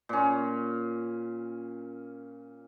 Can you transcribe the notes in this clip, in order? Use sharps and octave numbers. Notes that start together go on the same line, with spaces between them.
A#2 C#4